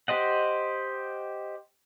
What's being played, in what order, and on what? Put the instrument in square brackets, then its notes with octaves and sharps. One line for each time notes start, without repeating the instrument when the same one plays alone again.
[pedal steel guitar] G4 C5 D#5 F#5